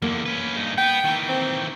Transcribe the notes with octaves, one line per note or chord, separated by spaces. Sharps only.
E2 D3 A#3
C#4 B4
G2 D#4
B3 G5
D#3 E3
C4